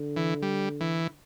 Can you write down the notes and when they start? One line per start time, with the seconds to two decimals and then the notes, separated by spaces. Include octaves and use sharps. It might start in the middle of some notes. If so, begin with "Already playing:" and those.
Already playing: D3
0.17 E3
0.42 G3
0.81 E3